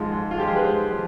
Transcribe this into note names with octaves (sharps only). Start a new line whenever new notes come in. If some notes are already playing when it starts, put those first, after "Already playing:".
Already playing: G#2 F3 G#3
G#2
F4
F3 G#3 G4
G#4
B4
G#2 C5
F3